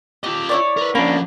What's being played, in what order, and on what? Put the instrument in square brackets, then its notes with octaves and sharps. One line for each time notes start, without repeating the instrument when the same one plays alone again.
[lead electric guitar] F4 D#5 [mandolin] G4
[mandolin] E4 C#5 D5
[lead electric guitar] A#4 B4
[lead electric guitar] F3 C#4 [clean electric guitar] A#3 D4 [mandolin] B5